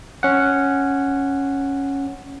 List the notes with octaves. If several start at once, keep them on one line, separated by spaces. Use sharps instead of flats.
C#4 F#5